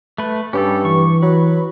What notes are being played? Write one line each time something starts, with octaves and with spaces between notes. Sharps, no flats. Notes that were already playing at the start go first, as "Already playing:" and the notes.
A3 B4
G2 C#4 G4 A4
E3 C#6
F#3 B4